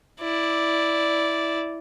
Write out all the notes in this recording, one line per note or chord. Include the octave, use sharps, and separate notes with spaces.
E4 D5